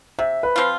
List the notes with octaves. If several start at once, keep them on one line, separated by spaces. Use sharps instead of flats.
C3 E5
B4
F3 C4 F4